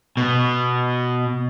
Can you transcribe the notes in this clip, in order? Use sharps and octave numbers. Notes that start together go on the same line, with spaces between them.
B2